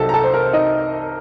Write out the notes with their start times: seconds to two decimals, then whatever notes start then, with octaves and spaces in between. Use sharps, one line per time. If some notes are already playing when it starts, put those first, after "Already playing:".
Already playing: C2 C3 F#3 C4 D#4 A4 A5
0.09 A#5
0.14 A4 A5
0.23 C5
0.34 A#4
0.44 C5
0.53 D#4 D#5